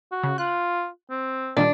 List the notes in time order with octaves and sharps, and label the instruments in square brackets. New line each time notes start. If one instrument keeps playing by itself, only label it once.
[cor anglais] F#4
[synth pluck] C#3
[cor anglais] F4 [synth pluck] F#6
[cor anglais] C4
[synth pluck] A#2 D#3 G3 [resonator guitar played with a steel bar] D4